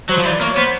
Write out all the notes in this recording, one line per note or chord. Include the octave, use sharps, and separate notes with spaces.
F#3 C5
F3
E3 D5
A#3 C#5
B3 C5